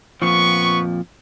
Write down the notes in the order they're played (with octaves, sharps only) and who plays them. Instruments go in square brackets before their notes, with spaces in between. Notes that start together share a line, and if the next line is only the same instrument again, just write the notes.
[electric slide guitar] F2 A#2 F3 [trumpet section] B3 C#6